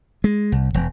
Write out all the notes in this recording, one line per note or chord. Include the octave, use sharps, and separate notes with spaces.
G#3
C2
E1